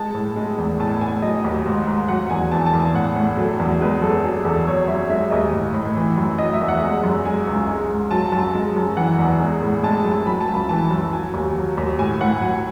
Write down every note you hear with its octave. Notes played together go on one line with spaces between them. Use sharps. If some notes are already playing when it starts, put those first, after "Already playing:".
Already playing: G#3 A5
A2
G#3
E2
A2 A5
A2 G#5
F#3 D#5
D#2
G#2
G#2
F#3 F#5
E2 G#5
E3 A5
A5
E2
G#5
A2 F#5
A2
F#3 A4
E2
G#3 B4
F#2 A4
F#3 G#4
E2 A4
F#3 C#5
F#2 E5
G#3 E5
D#2 D#5
A2
A2
E3
F#2
F#3 D#5
E5
E2
F#5
G#3
F#2
G#3 G#5
C#2
G#3
G#2
F#3 A5
F#2 A5
G#3
F#2
E3 F#5
E2
G#3
A2
G#3 A5
F#2 A5
F#3 B5
A5
C#2
B5
E3 A5
F#2
F#3 G#5
D#2
F#3
D#2
A2 G#5
A2 F#5
F#3 G#5